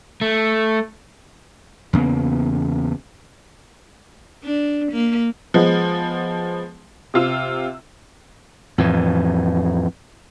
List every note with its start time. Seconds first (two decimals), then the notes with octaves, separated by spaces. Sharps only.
0.21 A3
1.93 E2 C#3 A#3 B3
4.44 D4
4.92 A#3
5.54 F3 G#3 B3
7.14 C3 F4 E6
8.78 F2 A2 E3